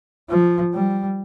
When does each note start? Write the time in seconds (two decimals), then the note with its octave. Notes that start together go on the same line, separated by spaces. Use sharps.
0.29 F3
0.74 G3